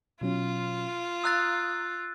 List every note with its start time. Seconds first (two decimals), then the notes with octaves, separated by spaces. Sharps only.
0.21 B2 F#3 C#4 F4
1.24 F5 A#5 D#6 E6 F#6 A6